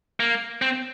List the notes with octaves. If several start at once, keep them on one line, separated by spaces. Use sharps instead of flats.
A#3
C4